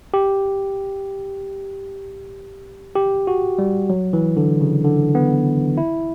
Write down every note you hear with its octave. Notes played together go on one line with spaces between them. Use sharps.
G4
G4
F#4
G3
F#3
E3
D3
C#3
D3
B3
E4